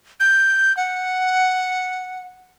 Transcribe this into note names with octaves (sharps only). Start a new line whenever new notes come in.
G6
F#5